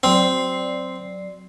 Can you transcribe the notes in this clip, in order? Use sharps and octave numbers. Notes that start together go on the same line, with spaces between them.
F#3 C4 D5 C7